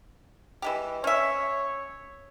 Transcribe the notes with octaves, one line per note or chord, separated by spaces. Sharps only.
E3 G#3 G4
C#4 C#5 E5